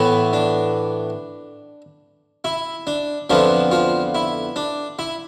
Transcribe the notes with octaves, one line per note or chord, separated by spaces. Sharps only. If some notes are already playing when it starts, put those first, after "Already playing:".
Already playing: A2 E3 B3
D4
E4
D4
F2 D3 F3 B3 D4 E4
F3 F4
E4
D4
E4